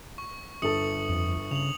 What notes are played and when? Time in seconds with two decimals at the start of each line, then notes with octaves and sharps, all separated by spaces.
0.18 C#6
0.62 G1 A4 D#6 C#7 F#7
1.09 F2
1.51 C#3 F7 F#7